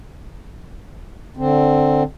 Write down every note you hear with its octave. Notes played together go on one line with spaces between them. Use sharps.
D3 C4